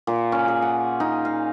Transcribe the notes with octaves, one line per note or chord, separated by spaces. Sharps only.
A#2
C#4
G#4
F#5
D#4
F5